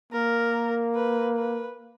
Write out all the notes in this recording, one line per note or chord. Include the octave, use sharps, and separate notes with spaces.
A#3 A#4
B4
B4